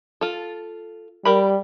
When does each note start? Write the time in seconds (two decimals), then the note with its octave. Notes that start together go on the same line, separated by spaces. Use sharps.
0.21 F4 A4
1.25 G3 G4 A#4 B5